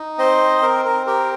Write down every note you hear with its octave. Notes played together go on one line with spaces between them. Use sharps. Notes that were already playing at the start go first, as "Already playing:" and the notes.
Already playing: D#4
C4 C5 D#5
C4 A#4
A#4
G4 A#4